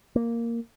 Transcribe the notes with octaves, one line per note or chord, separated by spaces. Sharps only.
A#3